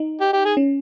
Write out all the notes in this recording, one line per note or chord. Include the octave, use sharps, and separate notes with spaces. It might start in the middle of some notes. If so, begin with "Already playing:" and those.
Already playing: D#4
G4
G4
G#4
C#4